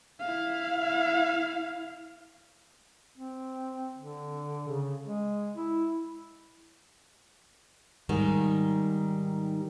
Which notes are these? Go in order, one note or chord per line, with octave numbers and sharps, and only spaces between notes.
E4 F5
C4
D3
C#3
G#3
E4
G#2 D#3 G3